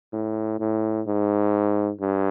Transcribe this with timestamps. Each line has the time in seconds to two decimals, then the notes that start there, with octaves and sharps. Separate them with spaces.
0.13 A2
0.59 A2
1.07 G#2
2.00 G2